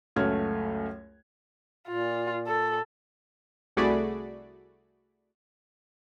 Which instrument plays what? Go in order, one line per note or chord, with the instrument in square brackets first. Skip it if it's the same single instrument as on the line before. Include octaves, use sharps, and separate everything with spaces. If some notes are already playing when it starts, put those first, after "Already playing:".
[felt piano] C#2 F#2 A3 F#4 F6 G#6
[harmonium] A#2 [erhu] F4
[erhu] A4
[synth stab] C2 A3 F#4 G#4 D5 B5